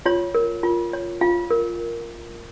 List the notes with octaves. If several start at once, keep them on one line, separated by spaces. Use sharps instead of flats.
F4 C#5
A#4
F4
C#5
F4 F5
A#4